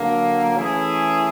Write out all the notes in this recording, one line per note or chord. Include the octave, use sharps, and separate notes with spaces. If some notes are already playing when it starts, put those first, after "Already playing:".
Already playing: D3 F#3 A#3
E3 A3 C#4 E4 G#4